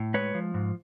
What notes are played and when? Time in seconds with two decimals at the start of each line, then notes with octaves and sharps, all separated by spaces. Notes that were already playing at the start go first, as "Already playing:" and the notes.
Already playing: A2
0.14 G#3 B4 C#5
0.35 F3
0.54 G#2